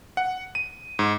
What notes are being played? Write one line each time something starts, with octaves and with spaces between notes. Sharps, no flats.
F#5
D#7
G#2